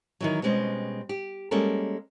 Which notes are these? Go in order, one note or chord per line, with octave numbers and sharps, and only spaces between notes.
D#3 E3 F#3
B2 G3 G#3 C4 C#4
G4
G3 G#3 A#3 C#4 A4 A#4